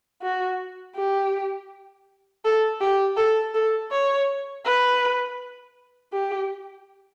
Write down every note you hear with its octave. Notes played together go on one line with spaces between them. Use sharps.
F#4
G4
A4
G4
A4
A4
C#5
B4
G4